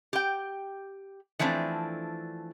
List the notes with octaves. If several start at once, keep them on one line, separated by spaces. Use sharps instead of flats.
G4 G5
E3 F3 A3 C4 D4